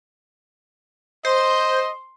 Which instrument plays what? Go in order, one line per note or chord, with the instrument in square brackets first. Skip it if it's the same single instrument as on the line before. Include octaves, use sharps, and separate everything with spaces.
[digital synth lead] C5 [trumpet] D#5 [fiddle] C6